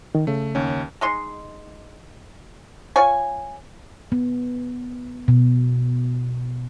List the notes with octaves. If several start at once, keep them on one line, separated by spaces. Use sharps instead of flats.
D#3
C#3 A3
D#2 C#4
G#3 D#4 C6
F4 C#5 G#5
B3
B2